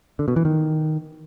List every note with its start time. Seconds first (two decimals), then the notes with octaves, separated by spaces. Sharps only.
0.19 D3
0.28 B2
0.36 E3
0.45 D#3